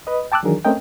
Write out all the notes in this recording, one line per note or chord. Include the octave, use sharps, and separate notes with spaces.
B4 D#5
G5 A5 D6 E6 F#6
D#3 E3 F#3 D4 G#4 A#4
A3 C4 C#4 A#4 D#5 G5